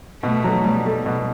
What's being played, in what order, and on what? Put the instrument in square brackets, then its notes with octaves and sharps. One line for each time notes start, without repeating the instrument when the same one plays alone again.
[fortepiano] B2 [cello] A3
[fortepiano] F#3
[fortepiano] B2 [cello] G3
[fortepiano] A3
B2